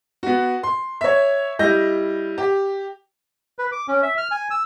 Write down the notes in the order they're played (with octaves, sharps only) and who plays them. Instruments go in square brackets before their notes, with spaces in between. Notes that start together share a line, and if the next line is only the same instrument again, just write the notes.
[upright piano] B3 F#4
C6
C#5 E5
G3 E4 D#5 G6 A#6
G4
[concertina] B4
D6
C#4
E5
F6
G#5
E6